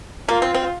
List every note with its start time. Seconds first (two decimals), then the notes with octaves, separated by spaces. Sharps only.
0.28 A#3 F4
0.42 C4
0.54 C4